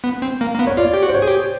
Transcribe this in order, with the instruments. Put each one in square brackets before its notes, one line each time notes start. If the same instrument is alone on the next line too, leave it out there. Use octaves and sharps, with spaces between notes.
[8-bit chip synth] B3
C4
A#3
A#3
B3
[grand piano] C#5
[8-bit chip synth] F4 [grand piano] D5
[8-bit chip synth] G4
F#4
[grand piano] C5
C#5
[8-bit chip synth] G#4
G4